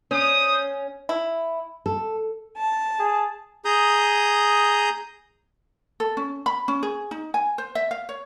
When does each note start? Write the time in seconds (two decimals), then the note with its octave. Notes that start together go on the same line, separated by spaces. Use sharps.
0.11 C#4 C5 D#6
1.09 E4
1.86 A4
2.58 A5
2.99 G#4
3.65 G#4 A#5 D#6 G6
6.00 A4
6.17 C#4
6.46 B5
6.68 C#4
6.83 G#4
7.11 D#4
7.34 G#5
7.58 C5
7.75 E5
7.91 F5
8.09 C#5